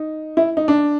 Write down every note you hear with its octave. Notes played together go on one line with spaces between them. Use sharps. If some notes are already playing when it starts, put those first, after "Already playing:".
Already playing: D#4
E4
D#4
D4